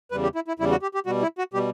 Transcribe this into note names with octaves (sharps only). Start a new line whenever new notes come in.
E2 C#3 G3 B4
G4
E4
E4
E2 C#3 G3 E4
F#4
G4
G4
B2 G3 F#4
E4
F#4
B2 G3 G4